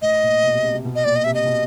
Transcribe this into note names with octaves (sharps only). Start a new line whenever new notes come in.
A2 D#5
A#2
B2
C3
C3
C3
B2
D#5
A#2 D5
D#5
C3 E5
D#5
B2